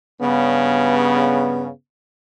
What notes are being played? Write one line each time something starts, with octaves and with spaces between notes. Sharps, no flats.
G2 C#3 B3